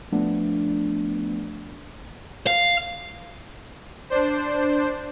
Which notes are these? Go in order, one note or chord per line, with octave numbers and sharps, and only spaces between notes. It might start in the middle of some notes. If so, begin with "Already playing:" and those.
F3 A3 B3 D4
F5
D4 C5